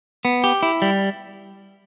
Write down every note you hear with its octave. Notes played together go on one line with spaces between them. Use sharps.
B3
G4
E4
G3